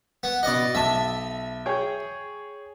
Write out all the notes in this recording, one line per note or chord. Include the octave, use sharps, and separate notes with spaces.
B3
B2 D5 D#5 F#5
B1 E5 A5
G#4 C#5 G5